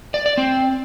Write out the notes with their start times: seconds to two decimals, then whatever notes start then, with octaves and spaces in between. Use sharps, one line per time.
0.14 D5
0.26 D5
0.38 C4